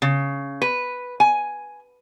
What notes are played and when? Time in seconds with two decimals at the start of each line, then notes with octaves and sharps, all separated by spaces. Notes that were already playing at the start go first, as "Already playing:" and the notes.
0.02 C#3
0.62 B4
1.20 G#5